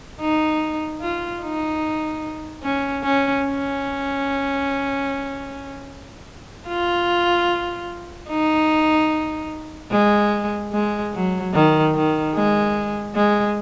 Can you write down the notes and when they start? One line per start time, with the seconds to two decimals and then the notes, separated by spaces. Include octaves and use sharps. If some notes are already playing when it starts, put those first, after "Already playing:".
0.21 D#4
1.01 F4
1.41 D#4
2.63 C#4
3.03 C#4
3.44 C#4
6.68 F4
8.29 D#4
9.91 G#3
10.72 G#3
11.13 F#3
11.53 D#3
11.94 D#3
12.34 G#3
13.15 G#3